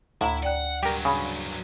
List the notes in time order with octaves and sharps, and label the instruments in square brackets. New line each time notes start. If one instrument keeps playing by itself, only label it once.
[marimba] D2 A#5 [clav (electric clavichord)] A2 [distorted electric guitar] E4
[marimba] D5 G5 F#6 [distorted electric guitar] F#5
[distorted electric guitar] G2 F#3 [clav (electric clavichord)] G4 A#4 [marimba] G5
[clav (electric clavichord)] C#3 [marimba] B5